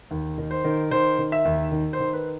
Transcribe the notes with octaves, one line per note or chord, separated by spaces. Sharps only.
D#2
D#3
C5
D#3
D#3 C5
D#3
E5
D#2
D#3
C5
D#3
B4